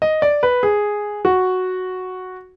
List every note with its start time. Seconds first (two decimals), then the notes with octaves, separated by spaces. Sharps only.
0.02 D#5
0.22 D5
0.43 B4
0.63 G#4
1.25 F#4